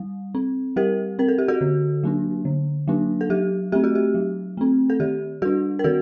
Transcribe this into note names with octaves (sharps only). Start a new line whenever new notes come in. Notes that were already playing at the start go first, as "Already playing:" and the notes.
Already playing: G3
C4
G3 G4 A#4
C4 A#4
A4
G4
F#4 A4
D3
F#3 A#3 D4
D3
F#3 A#3 D4
A4
F#3 G4
A3 C4 G4
F#4
G4
F#3
A3 C4
A4
D#3 G4
G3 D4 F#4 A4
A#4
D#3 F#4 A4